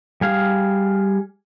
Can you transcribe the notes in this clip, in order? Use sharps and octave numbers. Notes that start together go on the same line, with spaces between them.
G3 G#4 F5